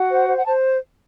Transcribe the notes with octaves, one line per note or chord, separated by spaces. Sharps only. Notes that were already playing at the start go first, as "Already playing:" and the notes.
Already playing: F#4 F#5
C5
C5
F#5
C5 A5